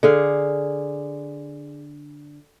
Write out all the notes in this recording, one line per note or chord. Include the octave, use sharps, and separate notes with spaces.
D3 G#4 F5